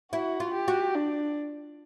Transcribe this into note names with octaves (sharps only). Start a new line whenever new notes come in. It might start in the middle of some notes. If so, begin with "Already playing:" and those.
E4 F#4
F4
G4
F#4
D4